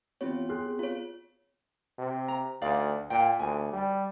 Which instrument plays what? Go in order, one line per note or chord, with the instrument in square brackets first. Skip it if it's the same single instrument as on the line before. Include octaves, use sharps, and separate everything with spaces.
[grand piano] E3 F4 G4 [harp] B3 C4 [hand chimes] C#5
[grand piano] G4 C6 F#6 [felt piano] G#4
[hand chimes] F4 C#5
[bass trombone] C3
[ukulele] A#5
[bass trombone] D2 [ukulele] D#4 D5 F5
[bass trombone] A#2 [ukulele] G5
[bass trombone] D2 [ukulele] G#5
[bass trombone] G3